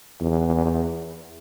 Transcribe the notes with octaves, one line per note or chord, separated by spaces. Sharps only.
E2